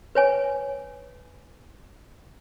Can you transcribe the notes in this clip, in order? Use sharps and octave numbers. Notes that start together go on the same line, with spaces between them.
B4 C#5 G#5